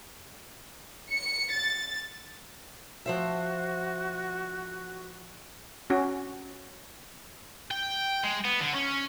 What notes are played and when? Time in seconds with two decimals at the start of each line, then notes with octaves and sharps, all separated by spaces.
1.11 C#7
1.53 A6
3.06 F3 F#4 C5 E5
5.90 C#4 F#4
7.71 G5
8.24 G#3
8.45 B3
8.60 D3
8.75 C#4